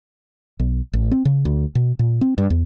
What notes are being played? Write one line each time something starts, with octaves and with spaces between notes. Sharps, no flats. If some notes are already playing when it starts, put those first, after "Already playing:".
B1
A1
C4
C#3
D2
B2
A#2
C4
G2
E2